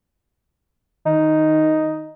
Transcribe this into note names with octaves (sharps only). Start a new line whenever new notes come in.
D#3 D#4